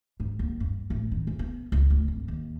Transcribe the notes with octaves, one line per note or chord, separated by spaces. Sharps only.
G#2
D#2
G2
A1
D#3
G#2
B3
C#2
D2
G#1
D#2